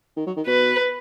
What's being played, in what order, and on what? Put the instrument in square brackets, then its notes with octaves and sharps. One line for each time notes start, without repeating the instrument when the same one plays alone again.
[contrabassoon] D#3
F#3
D#3
[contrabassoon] B2 [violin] B4